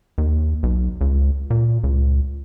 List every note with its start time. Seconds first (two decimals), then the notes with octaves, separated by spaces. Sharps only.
0.18 D#2
0.63 B1
1.01 C#2
1.50 A#2
1.84 C#2